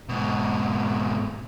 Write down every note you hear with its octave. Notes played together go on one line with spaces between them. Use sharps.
G#2 B2